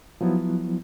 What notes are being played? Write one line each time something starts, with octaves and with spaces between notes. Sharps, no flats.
F3 F#3 B3 E4